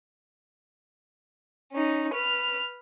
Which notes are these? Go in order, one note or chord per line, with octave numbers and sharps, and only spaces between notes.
C#4 D#4
B4 F6